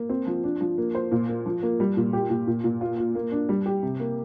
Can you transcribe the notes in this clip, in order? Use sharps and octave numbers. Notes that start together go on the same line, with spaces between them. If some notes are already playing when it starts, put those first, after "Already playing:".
Already playing: A#3
C4
F3
D4
F3
A#3
C5
A#2
A#3
F3
A#3
G3
A#2
G4
A#2
A#2
A#2
F4
F4
A#3
D4
G3
G4
C3
A#3